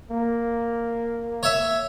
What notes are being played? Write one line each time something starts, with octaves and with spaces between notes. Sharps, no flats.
A#3
C#5 E5